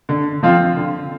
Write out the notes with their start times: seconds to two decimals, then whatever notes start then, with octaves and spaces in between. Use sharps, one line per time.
0.09 D3
0.43 F3 C4 F4
0.77 D3